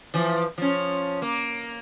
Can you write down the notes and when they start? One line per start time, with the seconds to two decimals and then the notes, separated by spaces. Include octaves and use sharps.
0.14 E3 F3
0.58 F3 C#4
1.22 A#3